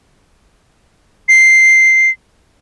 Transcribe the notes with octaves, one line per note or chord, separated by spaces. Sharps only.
C7